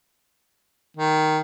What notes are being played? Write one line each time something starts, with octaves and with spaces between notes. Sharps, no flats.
D#3